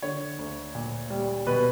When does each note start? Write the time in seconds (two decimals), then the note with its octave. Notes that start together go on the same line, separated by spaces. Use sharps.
0.02 D3 C#5
0.38 D2
0.75 A#2
1.10 G3
1.47 B2 B4